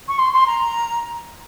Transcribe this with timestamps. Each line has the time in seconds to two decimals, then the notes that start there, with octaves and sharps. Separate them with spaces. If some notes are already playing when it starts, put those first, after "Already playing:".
0.08 C#6
0.18 C6
0.33 C6
0.46 A#5